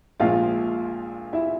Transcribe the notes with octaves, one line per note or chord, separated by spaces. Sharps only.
A#1 A#2 F3 G#3 F4 F5
E4 E5